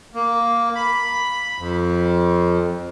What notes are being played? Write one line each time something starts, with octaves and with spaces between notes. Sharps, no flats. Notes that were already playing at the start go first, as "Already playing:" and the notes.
A#3
B5
F2